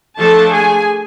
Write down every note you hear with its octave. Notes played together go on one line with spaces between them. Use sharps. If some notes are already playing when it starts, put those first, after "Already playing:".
F3 A3 D4 A4 A5
G#4 G#5